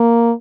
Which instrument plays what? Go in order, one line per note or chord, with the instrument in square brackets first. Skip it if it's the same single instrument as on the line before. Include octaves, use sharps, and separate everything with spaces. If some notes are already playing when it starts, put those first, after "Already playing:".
Already playing: [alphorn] A#3